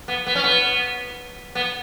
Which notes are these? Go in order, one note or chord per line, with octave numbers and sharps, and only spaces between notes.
B3
B3
C#4
B3
B3